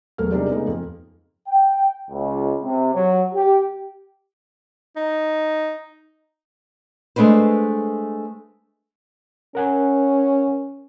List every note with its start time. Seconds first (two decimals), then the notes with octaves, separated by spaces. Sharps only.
0.18 E1 F#3 A3 A#4 F6
0.31 C3 G3 D4 D#4 G4 G#4
0.49 C#3 G#3 A3 B3 D#4
0.67 F2
1.47 G5
2.09 C#2
2.63 C3
2.93 F#3
3.33 G4
4.96 D#4
7.16 G#3 A3 D4 B4 C5
9.55 C#4 A#4 F#5 G#5